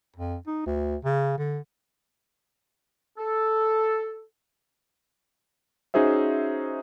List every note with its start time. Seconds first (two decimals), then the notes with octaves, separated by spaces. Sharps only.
0.16 F2
0.47 D#4
0.66 D2
1.05 C#3
1.38 D3
3.18 A4
5.94 C#4 D#4 F#4 G#4 C5 E5